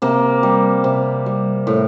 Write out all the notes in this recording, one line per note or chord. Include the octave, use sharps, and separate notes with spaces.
C3 A#3
G3
C3
G3
A2